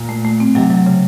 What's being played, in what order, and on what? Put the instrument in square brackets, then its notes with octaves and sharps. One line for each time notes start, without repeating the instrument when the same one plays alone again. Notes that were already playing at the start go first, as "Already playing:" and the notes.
Already playing: [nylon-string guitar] A#2
[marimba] A3
A3
C4
[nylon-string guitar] C3 [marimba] F#3
[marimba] F#3
C#3